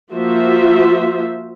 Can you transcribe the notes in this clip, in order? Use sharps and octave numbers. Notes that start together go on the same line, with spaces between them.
F3 A#3 F4 F#4 C5 E5